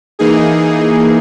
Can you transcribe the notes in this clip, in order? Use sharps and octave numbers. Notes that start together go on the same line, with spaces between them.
E3 A#3 D#4 G#4